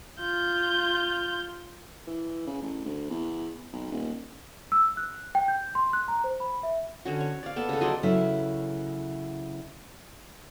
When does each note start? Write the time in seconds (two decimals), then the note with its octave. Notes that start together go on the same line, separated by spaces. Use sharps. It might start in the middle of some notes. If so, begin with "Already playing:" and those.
0.21 F4 G6
2.07 E3
2.47 C#3
2.62 A1
2.85 D2
3.10 E2
3.73 B1
3.91 D#1
4.72 E6
4.97 F#6
5.35 G5
5.48 G6
5.75 C6
5.93 F#6
6.08 A#5
6.24 C5
6.40 B5
6.63 E5
7.05 D3 C#4 F#4
7.21 C#5
7.43 D5 F5
7.56 B3 A4 A5
7.69 C#3 A4
7.81 F#3 D5 D#5 C6
8.03 C#3 F#3 E4 A4 B4 E5